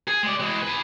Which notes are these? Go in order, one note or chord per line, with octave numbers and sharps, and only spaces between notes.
G#4
G#3 D5
E3 G#3
G#4 B4